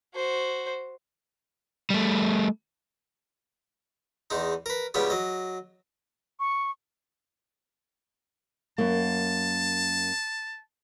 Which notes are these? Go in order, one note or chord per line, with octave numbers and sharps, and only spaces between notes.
F#4 C5
G3 A3
E2 G#3 D#4
A#4 B4
C#2 C#3 G3 B3 C#5
F#3 D#5
C#6
F#2 A#3 A5